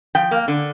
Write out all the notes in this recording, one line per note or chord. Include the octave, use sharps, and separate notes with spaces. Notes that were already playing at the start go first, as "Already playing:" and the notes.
F3 G5
A#3
D3